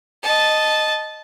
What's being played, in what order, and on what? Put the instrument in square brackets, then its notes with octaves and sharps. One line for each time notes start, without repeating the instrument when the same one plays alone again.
[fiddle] D#5 A5